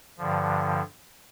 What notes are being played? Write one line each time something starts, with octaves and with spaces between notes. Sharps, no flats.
G2 D3 F3